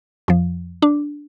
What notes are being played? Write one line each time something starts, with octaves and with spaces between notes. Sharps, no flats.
F2 F3
D4